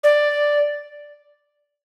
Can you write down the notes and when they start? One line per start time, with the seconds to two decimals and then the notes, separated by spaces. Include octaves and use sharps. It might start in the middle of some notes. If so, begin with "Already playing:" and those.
0.04 D5